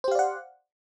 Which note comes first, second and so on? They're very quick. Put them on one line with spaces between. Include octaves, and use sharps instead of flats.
C5 G4 F5 D5 F#5